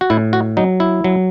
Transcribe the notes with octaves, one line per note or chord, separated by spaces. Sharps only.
F#4
A2 E4
F#4
F#3 D#4
E4
F#3